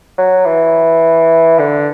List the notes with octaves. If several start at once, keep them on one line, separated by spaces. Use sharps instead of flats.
F#3
E3
D3